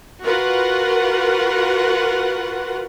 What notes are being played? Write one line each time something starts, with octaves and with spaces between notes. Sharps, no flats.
F4 F#4 A#4 B4 F#5